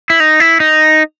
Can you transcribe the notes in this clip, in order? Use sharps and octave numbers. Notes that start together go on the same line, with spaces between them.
E4
D#4
E4
D#4